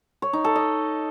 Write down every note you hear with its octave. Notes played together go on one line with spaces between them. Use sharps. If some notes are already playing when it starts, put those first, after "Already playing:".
C#5
D#4
A4
D#5